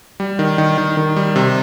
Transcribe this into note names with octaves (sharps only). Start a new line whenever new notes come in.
G3
D#3
D#3
D#3
D#3
G3
C3